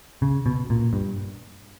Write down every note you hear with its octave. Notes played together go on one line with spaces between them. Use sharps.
C#3
B2
A#2
G2